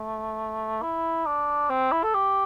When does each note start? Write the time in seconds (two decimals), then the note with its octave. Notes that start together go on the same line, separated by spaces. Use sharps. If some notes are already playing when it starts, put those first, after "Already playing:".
Already playing: A3
0.82 E4
1.26 D4
1.70 C4
1.92 E4
2.03 A4
2.14 G4